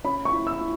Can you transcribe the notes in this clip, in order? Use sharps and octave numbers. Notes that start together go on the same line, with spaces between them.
C#4 B5
C#6
E4
E6
E4